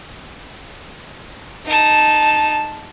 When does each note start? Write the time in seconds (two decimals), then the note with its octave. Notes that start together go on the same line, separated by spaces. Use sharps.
1.66 D#4 A5